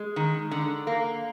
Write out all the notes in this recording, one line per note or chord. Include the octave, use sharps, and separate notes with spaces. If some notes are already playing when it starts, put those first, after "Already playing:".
Already playing: G#3
D#3
D3
A#3